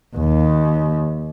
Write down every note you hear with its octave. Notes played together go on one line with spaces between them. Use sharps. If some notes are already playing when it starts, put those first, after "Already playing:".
D#2